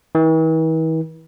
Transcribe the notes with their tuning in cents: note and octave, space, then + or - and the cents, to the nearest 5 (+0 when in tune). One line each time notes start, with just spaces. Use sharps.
E3 -45